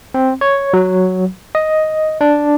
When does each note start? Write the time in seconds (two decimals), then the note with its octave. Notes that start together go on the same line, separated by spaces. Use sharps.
0.14 C4
0.41 C#5
0.73 F#3
1.55 D#5
2.21 D4